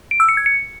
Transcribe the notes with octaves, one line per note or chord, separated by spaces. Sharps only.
D7
E6
C#7
G#6
C#7